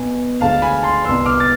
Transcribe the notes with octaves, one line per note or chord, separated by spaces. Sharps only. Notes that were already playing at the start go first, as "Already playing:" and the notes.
Already playing: B2 B3 G#5
D2 D3 G#3 F5 A5
G#5 B5
A5 C6
C2 B2 B3 C6 E6
D6 F6
A6